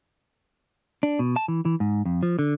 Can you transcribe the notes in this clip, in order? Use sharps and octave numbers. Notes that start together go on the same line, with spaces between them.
D4
B2
A5
E3
E3
G#2
F2
F3
D3